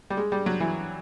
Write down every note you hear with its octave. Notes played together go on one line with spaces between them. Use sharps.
G3
G#3
G3
F#3
E3